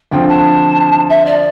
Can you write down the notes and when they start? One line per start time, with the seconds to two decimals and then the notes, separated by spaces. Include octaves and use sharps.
0.11 D2 D3 F3 C4 G5
0.28 A5
1.09 E5
1.25 D5